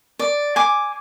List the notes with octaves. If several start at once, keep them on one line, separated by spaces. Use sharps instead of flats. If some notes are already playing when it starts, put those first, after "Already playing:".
D5
G#5 D6